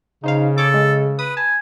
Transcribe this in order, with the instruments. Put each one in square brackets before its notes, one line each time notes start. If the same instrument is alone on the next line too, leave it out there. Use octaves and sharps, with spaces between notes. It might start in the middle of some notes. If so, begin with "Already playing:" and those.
[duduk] C#3 [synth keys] D#4 C5 F5
[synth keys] G#4 C#5 D6 [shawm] A4
[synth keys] G#3
[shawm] B4 [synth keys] D#6
[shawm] G#5 [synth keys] A5